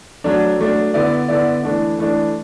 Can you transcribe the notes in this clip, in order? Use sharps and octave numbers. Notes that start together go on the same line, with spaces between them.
F#3 A3 D4
F#3 A3 D4
D3 B3 E4 D5
D3 B3 E4 D5
E3 A3 D4
E3 A3 D4